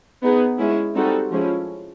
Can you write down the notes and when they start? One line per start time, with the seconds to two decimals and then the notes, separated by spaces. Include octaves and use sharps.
0.22 B3 D#4 G#4
0.58 G#3 C#4 E4
0.95 G3 C4 D#4 F#4 A4
1.31 F3 G#3 C#4 E4